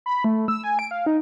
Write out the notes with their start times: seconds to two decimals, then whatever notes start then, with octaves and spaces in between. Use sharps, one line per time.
0.06 B5
0.24 A3
0.48 E6
0.64 G#5
0.79 D7
0.91 F5
1.06 D#4